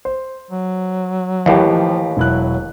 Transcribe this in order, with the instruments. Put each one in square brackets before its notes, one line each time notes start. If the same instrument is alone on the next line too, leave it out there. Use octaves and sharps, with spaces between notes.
[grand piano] C5
[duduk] F#3
[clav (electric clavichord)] D#2 A2 [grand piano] E3 G4
[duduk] F3
[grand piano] E1 E4 F#6 [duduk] F#3